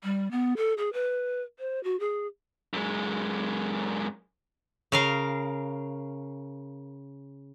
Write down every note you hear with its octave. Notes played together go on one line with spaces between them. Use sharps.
G3
B3
A4
G#4
B4
C5
F#4
G#4
F#2 G#3
C#3 A#4 F5